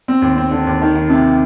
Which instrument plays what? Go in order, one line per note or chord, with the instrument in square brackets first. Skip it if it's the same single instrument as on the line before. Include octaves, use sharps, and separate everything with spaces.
[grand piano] C4
D#2
C4
D3
D#2
D#3
D#3
C3